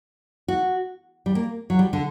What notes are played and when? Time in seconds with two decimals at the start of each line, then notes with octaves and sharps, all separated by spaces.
0.48 F#4
1.26 G3
1.35 A#3
1.70 F#3
1.79 G3
1.93 D3